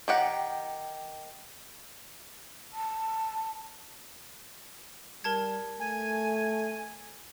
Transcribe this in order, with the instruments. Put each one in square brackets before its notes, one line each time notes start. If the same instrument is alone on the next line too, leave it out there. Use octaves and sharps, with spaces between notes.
[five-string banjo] D#3 G4 F#5
[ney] A5
[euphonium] G3 [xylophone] A#4 A5 G#6
[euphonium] A3 [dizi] G#5